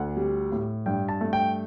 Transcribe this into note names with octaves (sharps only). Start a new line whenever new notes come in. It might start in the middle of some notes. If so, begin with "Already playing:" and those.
Already playing: D2 F#5
G3
A2
G2 G5
A5
A3
G5